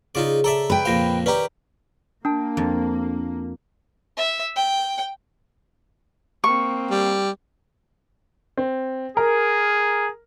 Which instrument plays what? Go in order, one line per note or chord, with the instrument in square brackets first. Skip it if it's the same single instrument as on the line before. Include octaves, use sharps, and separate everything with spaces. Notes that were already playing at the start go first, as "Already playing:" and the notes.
[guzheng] C#3 F3 [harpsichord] D#4 F4 D5
[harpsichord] A4 D5 E5 [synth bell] A#5
[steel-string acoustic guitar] B4 G5
[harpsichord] F2 A#2 C5 [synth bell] F5 A#6
[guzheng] D#3 [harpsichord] C#4 G4 [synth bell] B4 D5 A#5
[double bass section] A#3 [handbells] D4 A5
[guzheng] F2
[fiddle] E5
G5
[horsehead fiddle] A#3 C4 [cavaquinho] C#6
[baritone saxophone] G3
[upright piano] C4
[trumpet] G#4 [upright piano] A#4